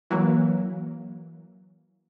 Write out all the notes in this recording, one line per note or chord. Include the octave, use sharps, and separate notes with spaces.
E3 F#3 A#3